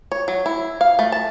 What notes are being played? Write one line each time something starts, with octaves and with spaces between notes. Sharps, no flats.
C#5
F#3
E4
F5
A3
A5